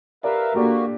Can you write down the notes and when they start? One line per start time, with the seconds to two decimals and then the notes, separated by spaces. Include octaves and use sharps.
0.24 G4 A#4 B4 D5 E5 F5
0.55 A#2 A#3 D4 F#4 G4 A4